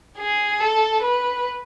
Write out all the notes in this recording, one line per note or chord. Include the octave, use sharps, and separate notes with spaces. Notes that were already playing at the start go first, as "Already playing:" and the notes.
G#4
A4
B4